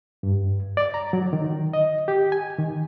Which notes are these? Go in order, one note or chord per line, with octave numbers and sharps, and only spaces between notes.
G2
D5
A#5
F#3
D#3
D#5
G4
G#5
D#3